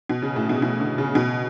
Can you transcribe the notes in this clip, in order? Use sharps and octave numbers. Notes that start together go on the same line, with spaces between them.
B2
C#3
A2
B2
C#3
B2
D3
C#3
B2